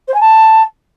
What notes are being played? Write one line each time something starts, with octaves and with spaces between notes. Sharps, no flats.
C5
G#5
A5